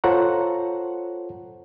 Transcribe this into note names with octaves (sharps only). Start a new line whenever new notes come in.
F4 A4 C5 C#5 F#5 A#5